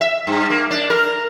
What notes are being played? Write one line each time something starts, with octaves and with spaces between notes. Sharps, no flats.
E5
G2
A#3
D4
A#4